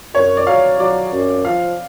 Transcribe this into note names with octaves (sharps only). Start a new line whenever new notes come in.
F#2 C#5
D5
F#3 F5
F#3 D5
F#2
F3 F5